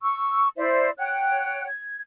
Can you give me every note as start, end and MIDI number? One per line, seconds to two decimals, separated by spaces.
0.03 0.47 85
0.03 0.47 88
0.57 0.90 64
0.57 0.90 72
0.57 0.90 74
0.57 0.90 76
0.98 1.66 73
0.98 1.66 78
0.98 1.66 79
0.98 1.66 90
1.67 2.01 92